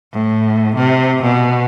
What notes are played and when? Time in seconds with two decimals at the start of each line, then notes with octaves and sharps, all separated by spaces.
0.13 A2
0.76 C3
1.23 B2